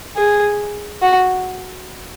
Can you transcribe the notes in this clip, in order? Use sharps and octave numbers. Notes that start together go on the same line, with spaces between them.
G#4
F#4